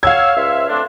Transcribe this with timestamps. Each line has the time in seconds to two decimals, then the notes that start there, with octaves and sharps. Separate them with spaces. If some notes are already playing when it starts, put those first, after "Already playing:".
0.03 C#5 F5 F#5 E6 G#6
0.36 C#2 C5 E5
0.69 A3 C4 D4